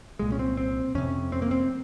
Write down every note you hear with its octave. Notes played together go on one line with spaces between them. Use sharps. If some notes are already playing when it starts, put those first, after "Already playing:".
C2 A#2 G#3
C#4
C4
C4
F2 C3 C#4
C4
A#3
C4